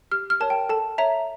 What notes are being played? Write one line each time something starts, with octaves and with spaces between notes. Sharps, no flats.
G4 F6
F6
A#4 C#5 A5
G5
A4 A5
C#5 E5 A#5